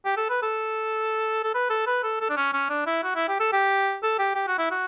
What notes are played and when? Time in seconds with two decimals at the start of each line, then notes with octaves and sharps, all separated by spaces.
0.05 G4
0.17 A4
0.30 B4
0.43 A4
1.43 A4
1.54 B4
1.70 A4
1.87 B4
2.03 A4
2.21 A4
2.30 D4
2.37 C#4
2.53 C#4
2.70 D4
2.86 E4
3.04 F#4
3.16 E4
3.28 G4
3.40 A4
3.53 G4
4.03 A4
4.19 G4
4.35 G4
4.48 F#4
4.59 E4
4.71 F#4